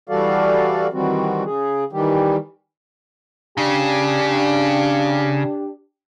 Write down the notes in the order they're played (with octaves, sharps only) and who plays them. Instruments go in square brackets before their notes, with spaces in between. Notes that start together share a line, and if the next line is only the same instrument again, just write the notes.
[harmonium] E3 G3 F#4 A4 D5 F5
D#3 E3 G3 C4 F#4
C#3 G#4
D#3 E3 G3 G4
[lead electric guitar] C#3 [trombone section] D4 G4